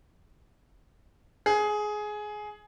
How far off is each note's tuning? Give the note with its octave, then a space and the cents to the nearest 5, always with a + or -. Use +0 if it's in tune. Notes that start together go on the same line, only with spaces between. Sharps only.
G#4 +15